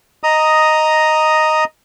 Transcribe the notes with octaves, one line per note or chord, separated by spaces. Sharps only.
D#5 A#5 D#6